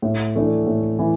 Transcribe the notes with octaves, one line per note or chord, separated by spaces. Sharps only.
A2
E3 A3 D4
A2
E3